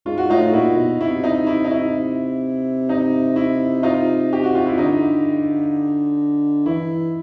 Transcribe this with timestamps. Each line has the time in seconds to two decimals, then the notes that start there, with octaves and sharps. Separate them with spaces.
0.06 G#2 F4
0.18 F#4
0.29 A2 D#4 F4
0.53 A#2 E4 F#4
0.77 B2
1.00 C3 E4
1.24 D#4
1.47 E4
1.65 D#4
1.71 E4
2.89 D#4
3.36 E4
3.83 D#4 F4
4.33 G4
4.44 F#4
4.55 F4
4.67 E4
4.78 D3 D#4
6.66 E3 E4